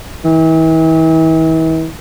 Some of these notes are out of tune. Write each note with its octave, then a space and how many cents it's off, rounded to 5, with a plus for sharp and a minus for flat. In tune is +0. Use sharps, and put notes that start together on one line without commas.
E3 -40